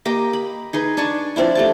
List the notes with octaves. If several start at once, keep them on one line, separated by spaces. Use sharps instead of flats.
A#3 G4 D#5 A#5
B5
D#4 G#4 B4
D4 G#5 A5 C#6
F3 C4 D4 E4
A3 G4 A5